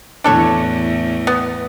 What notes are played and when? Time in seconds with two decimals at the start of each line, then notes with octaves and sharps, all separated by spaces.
0.24 E2 A2 D4 A4 C#5
1.27 B3